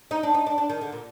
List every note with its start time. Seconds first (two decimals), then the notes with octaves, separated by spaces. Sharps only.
0.11 D#4
0.23 D4
0.34 D#4
0.46 D4
0.58 D4
0.69 D#3
0.81 D3
0.92 A#2